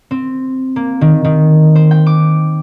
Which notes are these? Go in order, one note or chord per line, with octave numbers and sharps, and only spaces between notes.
C4
A#3
D#3
D#3
C5
G5
D6